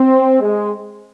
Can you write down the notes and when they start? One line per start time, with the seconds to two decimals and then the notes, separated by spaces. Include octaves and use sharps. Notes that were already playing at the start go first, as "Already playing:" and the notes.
Already playing: C4
0.40 G#3